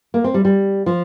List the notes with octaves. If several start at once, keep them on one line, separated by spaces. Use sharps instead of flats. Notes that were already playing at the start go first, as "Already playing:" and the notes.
A#3
C4
G3
G3
F3